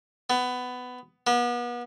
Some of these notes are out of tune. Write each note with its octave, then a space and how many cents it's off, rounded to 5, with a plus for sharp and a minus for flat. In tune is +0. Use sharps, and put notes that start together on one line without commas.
B3 +15
B3 -35